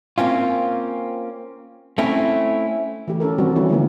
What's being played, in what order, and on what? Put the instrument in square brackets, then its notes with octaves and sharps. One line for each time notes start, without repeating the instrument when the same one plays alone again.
[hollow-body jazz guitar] A#3 C4 C#4 F4
A3 C4 C#4 E4
[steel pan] E3 A3 G4
C#4 G4 A4 A#4
D#3 G3 C4 F#4
E3 B3 C#4 E4
D3 F3 G#3 A#3 B3